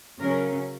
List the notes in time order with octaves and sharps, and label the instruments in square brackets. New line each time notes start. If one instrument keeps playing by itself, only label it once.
[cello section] C#3 F#3 C#4 A#4